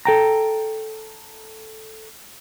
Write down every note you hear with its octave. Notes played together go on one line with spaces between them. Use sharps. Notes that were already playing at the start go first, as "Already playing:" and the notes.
A4 G5 A#5